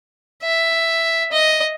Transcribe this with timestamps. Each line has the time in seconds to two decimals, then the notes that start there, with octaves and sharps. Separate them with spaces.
0.43 E5
1.32 D#5